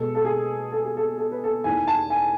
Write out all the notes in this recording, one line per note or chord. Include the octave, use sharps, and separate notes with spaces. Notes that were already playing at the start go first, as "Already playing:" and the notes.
Already playing: B2 G#3 A4
A4
G#4
A4
G#4
A4
A4
B4
A4
E2 D#3 A3 G#5
A5
G#5